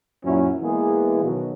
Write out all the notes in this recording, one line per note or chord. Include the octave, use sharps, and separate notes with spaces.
F#2 A#2 F#3 C#4 E4
E3 G#3 A#3 B3 G#4
B2 D#3 F#3